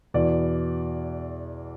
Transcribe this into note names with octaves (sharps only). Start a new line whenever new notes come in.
E2 B2 D5